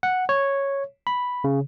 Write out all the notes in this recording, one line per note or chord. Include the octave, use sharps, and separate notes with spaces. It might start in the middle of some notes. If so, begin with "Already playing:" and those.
F#5
C#5
B5
C#3